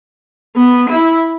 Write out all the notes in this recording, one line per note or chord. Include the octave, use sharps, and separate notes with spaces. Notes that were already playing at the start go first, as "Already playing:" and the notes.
B3
E4